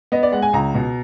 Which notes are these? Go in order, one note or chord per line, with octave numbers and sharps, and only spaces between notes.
B3 D#5
D5
G#3 F#5
G#5
C#2 A#5
B2